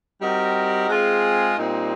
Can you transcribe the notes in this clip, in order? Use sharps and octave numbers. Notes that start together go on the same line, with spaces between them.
G3 C4 D#4 F#4 A#4
G#3 C4 F4 G#4
A#2 G3 C4 D#4